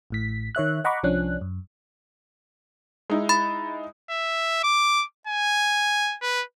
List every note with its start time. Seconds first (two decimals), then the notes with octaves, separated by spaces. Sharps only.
0.10 A1 A2 B6
0.55 D#3 C#5 E5 F#6
0.84 D#5 F#5 A#5 B5 C#6 D6
1.03 C2 F3 C#4 D4 F#6
1.41 F#2
3.10 G#3 D#4 E4
3.29 B5 A6
4.10 E5
4.63 D6
5.27 G#5
6.22 B4